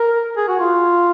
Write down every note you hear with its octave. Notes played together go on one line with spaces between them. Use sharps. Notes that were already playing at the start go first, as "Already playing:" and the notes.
Already playing: A#4
G#4
F#4
F4